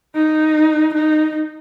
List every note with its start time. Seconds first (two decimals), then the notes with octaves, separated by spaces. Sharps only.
0.15 D#4
0.94 D#4